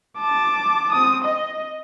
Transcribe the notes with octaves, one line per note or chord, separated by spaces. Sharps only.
A5 D6
C4 D#6
D#5